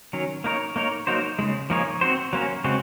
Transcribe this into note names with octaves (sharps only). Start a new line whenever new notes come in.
D#3 F#3 C#4
A#3 D#4 A#4 C#5
A#3 D#4 A#4 C#5
F#3 A#3 D#4 F#4 C5
C#3 F3 G#3
F3 A#3 D#4 G#4 C#5
C4 F#4 C5
F#3 A#3 C#4
C#3 G#3 C4 F#4